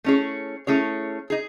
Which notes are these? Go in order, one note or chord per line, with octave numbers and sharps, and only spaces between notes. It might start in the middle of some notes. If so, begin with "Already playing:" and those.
A3 C#4 E4 G#4 C#5
A3 C#4 E4 G#4 C#5
D#4 G#4